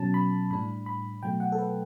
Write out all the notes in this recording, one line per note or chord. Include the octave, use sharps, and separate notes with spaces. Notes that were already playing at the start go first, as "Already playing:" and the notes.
Already playing: B2 F#3 C#4 A5
B5
A2 G3 D4 B5
B5
B2 F#3 A3 G5
F#5
A4
B4